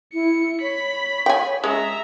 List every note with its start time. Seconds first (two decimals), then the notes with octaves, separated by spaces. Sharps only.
0.14 E4 C#7
0.62 C#5 B5
1.26 G5 G#5
1.64 G#3 C#4 E5 A#5